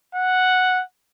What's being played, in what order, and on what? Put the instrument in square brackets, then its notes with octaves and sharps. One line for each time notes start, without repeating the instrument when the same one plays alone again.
[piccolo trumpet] F#5